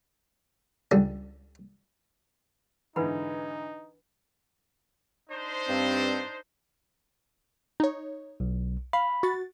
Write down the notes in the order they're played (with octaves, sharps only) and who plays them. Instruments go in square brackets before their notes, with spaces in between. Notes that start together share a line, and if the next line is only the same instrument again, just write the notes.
[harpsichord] C#2 D3 G3
[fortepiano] G#2 D3 E3 [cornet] D#4 [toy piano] B4 F#5 B5
[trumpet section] D4 D#4 C5
[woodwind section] G2 C4
[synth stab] D#4 C#5
[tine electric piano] B1
[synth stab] F5 [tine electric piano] B5
[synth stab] F#4 A6